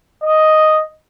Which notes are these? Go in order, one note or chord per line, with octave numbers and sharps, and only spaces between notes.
D#5